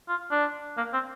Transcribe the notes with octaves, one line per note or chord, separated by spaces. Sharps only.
F4
D4
A#3
C4